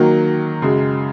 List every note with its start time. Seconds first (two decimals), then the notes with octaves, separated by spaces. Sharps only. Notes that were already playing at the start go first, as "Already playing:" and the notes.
Already playing: D#3 F#3 A#3
0.62 F#2 C#3 G#3